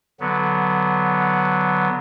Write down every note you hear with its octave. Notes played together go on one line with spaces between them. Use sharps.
D3 F#3 B3